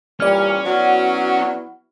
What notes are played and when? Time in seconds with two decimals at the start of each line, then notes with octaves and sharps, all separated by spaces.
0.20 A#2 E3 G3 C#4 D5 F6
0.64 F#3 B3 E4 F#4